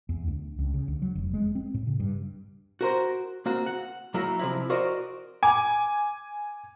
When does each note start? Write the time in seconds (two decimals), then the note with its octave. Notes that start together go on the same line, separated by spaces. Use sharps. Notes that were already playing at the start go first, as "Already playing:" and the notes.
0.09 E2
0.28 D2
0.59 C#2
0.74 C#3
0.88 D2
1.02 F#3
1.15 F1
1.34 G#3
1.55 C4
1.74 A2
1.87 C#3
2.00 G2
2.81 F#4 A#4 C5
3.46 A#3 C4 F#4
3.66 F#5
4.14 F#3 A#3 E4 F#4 A#4
4.39 C3 F3 E4
4.70 F#4 A#4 C5 D5 D#5
5.43 G#5 D6